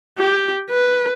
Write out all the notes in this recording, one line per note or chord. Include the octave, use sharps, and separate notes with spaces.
G4
B4